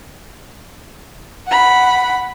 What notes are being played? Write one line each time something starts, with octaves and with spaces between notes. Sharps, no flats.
F#5 B5